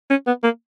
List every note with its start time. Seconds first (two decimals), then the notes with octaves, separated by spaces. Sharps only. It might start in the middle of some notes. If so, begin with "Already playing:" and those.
0.10 C#4
0.27 B3
0.44 A#3